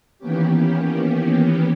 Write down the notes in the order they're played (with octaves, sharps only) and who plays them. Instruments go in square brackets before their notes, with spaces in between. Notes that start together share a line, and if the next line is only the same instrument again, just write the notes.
[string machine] D#3 E3 A#3 B3 C#4 G4